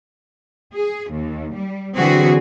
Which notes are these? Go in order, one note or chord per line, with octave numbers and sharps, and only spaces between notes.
G#4
D#2
G3
D3 E3 F#3 C4 F#4 G#4